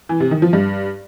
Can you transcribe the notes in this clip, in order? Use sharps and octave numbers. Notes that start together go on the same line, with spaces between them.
E3
C3
D#3
F3
G2